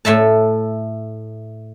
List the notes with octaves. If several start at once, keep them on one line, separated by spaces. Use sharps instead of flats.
A2 A3 E5 A5